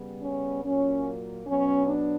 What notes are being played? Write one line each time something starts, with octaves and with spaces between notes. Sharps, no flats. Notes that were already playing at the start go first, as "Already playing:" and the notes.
Already playing: C#3 G3 B3
C#4
A#2 F#3 A#3 C#4
B2 F#3 B3 C#4
D4